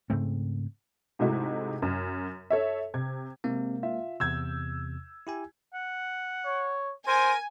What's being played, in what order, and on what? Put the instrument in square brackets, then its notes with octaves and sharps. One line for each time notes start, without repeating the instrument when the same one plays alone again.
[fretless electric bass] G#2 C#3 A3 C4
[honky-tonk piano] G#2 C3 G#3 A3 E4 F#4
F#2
A4 C#5 E5
C3 G#6
[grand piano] C3 [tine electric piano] G#3 A#3
[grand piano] F4 E5
[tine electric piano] E2 C3 [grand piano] E6 G6 G#6
[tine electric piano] E4 G4 G#5
[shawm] F#5
[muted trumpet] C#5
[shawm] A#4 [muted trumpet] C5 [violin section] G#5